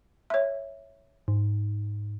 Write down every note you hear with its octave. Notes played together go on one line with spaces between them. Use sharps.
C#5 E5
G#2